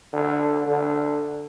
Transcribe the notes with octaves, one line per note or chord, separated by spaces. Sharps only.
D3
D3